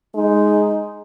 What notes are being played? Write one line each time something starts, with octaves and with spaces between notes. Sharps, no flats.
G#3 D#4